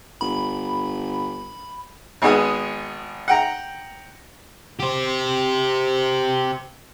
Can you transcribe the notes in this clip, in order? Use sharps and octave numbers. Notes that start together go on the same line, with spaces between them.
G1 B5
G#1 G#3 B3 G#5 D#6
F#5 G5 A#5
G4 C5